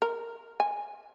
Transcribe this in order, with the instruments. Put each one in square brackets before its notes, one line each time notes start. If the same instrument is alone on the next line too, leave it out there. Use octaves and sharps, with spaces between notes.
[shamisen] A#4
G#5